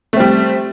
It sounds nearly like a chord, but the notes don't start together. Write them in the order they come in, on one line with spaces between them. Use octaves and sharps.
A3 C4 G3